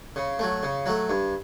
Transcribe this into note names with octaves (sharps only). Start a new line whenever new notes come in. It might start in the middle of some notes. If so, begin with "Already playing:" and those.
C#3
F#3 A3
C#3
F#3 A3
G2